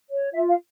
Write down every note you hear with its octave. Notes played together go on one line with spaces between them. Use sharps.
C#5
F4 E5
F5